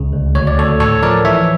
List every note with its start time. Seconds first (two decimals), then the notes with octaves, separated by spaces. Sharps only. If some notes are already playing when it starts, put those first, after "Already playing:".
Already playing: C#2 C#3
0.13 D2
0.35 D2 C#5
0.47 D5
0.58 D2 A4 C#5
0.80 A2 A4 C#5
1.03 F3 A#4 D5
1.25 E3 C#5 E5